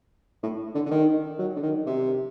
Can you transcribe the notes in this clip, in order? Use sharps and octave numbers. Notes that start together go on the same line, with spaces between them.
A2
D3
D3
D#3
F#3
D3
D#3
C3